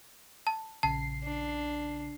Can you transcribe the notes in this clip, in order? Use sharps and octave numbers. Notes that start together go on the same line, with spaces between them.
A5
A#1 C#3 A5 C7
D4